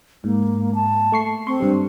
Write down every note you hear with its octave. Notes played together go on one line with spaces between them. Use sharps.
G#2 A#3
A5
A3 C#6 C7
C4 C6 C#6
G2 G3